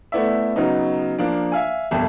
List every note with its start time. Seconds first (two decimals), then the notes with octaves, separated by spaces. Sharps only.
0.12 A3 B3 E4 D5 E5
0.56 C#3 F#3 B3 D#4
1.19 F3 A#3 D4
1.52 E5 F5 G#5
1.91 G1 C2 F2